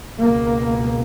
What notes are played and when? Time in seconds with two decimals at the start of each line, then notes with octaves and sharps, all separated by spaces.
0.22 C#2 B2 A#3